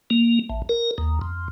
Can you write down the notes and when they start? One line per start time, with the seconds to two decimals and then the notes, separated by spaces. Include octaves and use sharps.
0.10 A#3
0.50 A1
0.69 A#4
0.98 D#2
1.21 F2